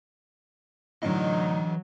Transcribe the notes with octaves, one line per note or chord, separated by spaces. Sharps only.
A2 D3 E3 F#3 D#4 D#5